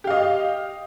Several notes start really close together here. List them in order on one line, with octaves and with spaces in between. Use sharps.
G4 F5 D#5